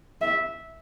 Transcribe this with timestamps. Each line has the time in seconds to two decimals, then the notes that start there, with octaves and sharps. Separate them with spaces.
0.21 E5